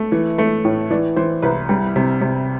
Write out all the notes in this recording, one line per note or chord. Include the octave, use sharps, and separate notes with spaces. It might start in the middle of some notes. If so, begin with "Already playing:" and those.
Already playing: A3
E3
A3
A2
E3 D5
E3 C5
C2 B4
G3
C3
C3